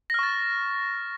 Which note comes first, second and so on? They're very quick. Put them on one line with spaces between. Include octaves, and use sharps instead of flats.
A#6 F6 C#6 A6